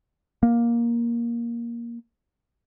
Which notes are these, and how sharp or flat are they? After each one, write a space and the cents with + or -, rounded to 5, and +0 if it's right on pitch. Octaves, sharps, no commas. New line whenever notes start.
A#3 +10